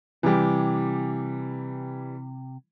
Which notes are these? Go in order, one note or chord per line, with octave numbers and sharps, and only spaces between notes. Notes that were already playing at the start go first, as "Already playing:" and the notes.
C3 E3 G3 G4